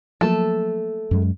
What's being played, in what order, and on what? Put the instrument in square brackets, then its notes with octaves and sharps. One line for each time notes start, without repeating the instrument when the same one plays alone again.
[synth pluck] F3 F#3 A#3 [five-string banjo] A3 A4
[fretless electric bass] F#2 F#3 G#3